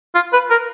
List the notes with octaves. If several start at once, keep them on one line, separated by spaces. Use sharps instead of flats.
F4
B4
A#4